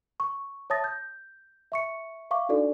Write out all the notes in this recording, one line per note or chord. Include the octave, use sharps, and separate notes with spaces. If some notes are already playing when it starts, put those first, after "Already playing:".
C#6
C#5 E5 A5 D#6 A6 A#6
G6
E5 C#6 C#7
E5 F5 C#6 D6
D4 D#4 F#4 A4 D5